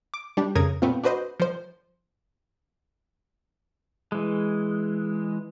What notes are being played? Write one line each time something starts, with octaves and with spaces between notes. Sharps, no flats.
D6
G3 D4 G4
F2 C#3 A#4 D#6 G#6 A#6
A#2 A3 B3 C4 F4
D4 F#4 B4 C5 D#5
F3 C5
E3 G#3